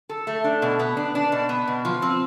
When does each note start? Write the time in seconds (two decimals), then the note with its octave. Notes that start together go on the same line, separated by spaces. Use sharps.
0.09 A4
0.27 A3
0.44 D4
0.62 B2
0.79 B3
0.97 D4
1.15 D4
1.32 B2
1.49 B3
1.67 B2
1.85 F3
2.02 C4